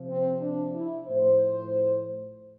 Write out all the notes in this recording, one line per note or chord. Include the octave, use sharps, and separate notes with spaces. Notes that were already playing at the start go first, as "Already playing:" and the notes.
Already playing: C3 F3
C4
D4
E4
A2 F3 C5